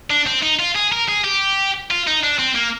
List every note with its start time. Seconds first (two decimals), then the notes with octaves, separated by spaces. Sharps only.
0.10 D4
0.26 C4
0.42 D#4
0.59 F4
0.75 G#4
0.92 A#4
1.08 G#4
1.24 G4
1.91 F4
2.07 D#4
2.23 D4
2.39 C4
2.55 A#3